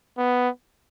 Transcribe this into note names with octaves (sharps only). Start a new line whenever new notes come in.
B3